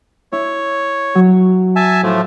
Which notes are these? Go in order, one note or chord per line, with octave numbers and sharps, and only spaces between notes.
E4 C#5
F#3
E5 G#5 A5
A2 F3 A3